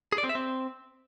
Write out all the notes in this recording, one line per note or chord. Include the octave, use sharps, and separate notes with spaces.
G#4
D5
C4
E5
C4